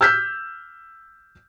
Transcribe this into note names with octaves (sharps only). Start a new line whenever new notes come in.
E6 F6 G6 B6